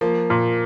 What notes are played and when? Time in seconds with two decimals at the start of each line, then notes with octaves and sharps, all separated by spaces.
0.01 F3 A#3
0.30 A#2